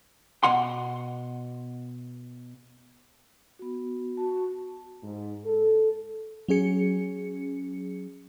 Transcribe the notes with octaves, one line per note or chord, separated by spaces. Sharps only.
B2 F#5 C6
B3 F#4
F#4 A5
G#2
A4
F#3 C#4 G#4 C#7